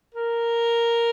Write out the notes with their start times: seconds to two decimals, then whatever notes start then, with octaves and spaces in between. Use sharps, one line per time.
0.14 A#4